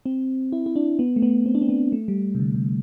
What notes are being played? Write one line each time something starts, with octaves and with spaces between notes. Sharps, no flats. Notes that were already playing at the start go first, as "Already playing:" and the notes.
C4
E4
E4
D4
B3
A3
B3
C4
D4
C4
B3
A3
G3
C3
D3
C3